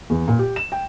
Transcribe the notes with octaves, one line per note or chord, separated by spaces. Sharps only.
E2
A#2
G4
E7
G5